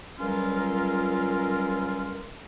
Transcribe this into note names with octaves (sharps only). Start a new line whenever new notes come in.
C#2 F#3 G3 C#4 F4 A#4